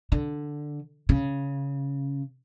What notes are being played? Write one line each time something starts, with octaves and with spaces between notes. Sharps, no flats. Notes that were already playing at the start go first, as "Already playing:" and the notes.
D3
C#3